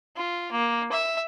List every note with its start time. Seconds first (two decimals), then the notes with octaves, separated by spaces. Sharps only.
0.16 F4
0.52 A#3
0.92 E5